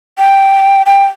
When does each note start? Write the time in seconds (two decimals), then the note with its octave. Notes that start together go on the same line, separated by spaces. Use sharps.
0.18 G5
0.86 G5